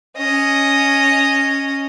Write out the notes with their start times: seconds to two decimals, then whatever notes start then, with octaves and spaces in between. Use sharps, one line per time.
0.17 C#4 D#5